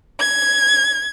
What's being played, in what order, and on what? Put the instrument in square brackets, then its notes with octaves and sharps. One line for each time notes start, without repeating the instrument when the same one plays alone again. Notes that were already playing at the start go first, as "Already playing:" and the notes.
[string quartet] G#6